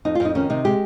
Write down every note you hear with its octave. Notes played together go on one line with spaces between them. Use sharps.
F2 D#4
F4
F2
D#4
D#3 C#4
C3 D#4
G#3 G4